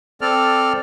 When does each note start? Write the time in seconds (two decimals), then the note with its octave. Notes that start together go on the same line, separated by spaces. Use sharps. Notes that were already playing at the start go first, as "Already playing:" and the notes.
0.21 C4 A4 D5 F6